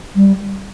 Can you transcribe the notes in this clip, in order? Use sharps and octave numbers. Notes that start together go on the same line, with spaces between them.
G3